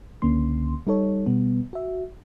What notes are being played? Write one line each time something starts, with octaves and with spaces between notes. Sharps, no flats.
C#2 D3 A#3 C#4 C6
G3 D#4 A4 C#5
B2 G3 B3
F#4 E5